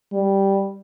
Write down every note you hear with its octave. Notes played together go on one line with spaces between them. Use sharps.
G3